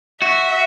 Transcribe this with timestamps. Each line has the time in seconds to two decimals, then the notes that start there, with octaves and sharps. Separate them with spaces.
0.22 F#4 E5